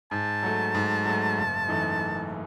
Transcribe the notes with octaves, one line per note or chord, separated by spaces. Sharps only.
G#2 A5
F#3 A3
G#2
F#3 A3
F#1
F#2 E3 A3 D#4
F#1